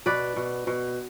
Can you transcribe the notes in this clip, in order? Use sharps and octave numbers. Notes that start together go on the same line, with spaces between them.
B2 B4 D5
B2
B2